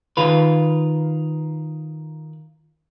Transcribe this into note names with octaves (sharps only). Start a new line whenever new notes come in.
D#3 F4 B4